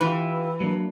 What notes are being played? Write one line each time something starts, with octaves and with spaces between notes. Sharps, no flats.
E3 F4 G4 B4
F#3 A#3 D4